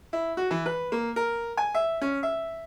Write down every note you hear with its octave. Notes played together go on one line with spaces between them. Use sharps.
E4
F#4
E3
B4
A#3
A#4
G#5
E5
C#4
E5